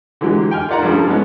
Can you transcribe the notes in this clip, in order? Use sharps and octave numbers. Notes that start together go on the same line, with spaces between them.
D3 E3 F#3 G#3 G4
G5 G#5 F6
F4 A#4 D5 F#5 A#5
G2 C#3 F3 G3 A3
G#2 G#3 A3 B3 C#4